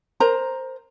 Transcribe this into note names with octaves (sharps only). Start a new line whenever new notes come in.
A#4 C5 A#5